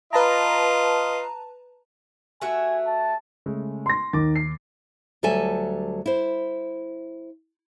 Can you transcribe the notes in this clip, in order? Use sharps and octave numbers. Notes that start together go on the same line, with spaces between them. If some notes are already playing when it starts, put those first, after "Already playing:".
F4 B4 D#5 A5 A#5
A3 F#4 E5 G#5
A5
C#3 G#3 A3
C6 A#6
D#2 D#3 D6 A6
C7
D2 F#3 G3 A4 E5 G#5
E4 C5